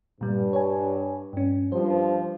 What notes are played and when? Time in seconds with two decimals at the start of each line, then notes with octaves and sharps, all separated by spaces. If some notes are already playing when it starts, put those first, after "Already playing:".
0.21 G2 A#2 G3
0.53 C#5 G#5
1.33 G2 C#4
1.72 G2 F3 C5